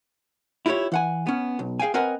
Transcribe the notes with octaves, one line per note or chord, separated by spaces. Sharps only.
E4 F4 G4 A4 C#5
E3 F#5 G#5
B3 C#4
B1
G#4 F5 G5 G#5
C4 A#4 B4 D#5 F#5 G#5